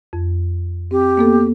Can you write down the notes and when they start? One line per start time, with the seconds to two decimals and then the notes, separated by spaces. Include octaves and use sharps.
0.13 F2
0.91 C4 G4
1.17 A#3 B3 A4